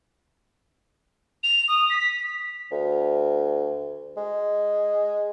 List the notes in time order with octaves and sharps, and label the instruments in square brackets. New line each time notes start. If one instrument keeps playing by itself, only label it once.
[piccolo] F7
D#6
B6
[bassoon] D2
G#3